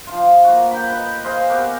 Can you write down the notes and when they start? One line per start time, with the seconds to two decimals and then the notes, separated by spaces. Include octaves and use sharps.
0.07 F3 F4
0.44 A#3 F#4
0.71 G5 A#5 B5
0.89 B4 D#5
1.24 G#4 C5 D#5 F5
1.49 B3 F#4 G4 A#4